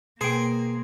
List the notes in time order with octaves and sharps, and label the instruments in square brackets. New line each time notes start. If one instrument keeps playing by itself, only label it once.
[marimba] B2 [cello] A#3 [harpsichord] G#4 [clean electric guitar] C5 G5